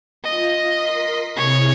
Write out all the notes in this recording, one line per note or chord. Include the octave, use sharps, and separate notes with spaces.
F4 D#5
A#4 C6 B6
C3 E4 G#4 C#5